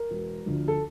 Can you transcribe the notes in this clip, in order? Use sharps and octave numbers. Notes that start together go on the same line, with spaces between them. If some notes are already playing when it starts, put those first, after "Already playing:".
Already playing: A#4
E1
D2 D3 F3
A4